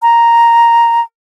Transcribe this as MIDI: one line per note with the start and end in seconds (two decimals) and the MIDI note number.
0.02 1.01 82